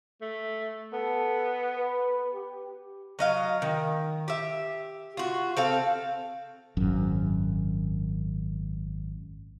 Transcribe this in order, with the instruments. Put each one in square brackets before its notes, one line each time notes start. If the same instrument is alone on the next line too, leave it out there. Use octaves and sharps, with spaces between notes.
[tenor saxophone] A3
[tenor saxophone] B3 [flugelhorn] A4
[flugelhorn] B4
G4
[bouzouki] F#3 D#5 F5
D#3
G4 E5
F4 F#4
C4 A4 F5
[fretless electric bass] G#1 F#2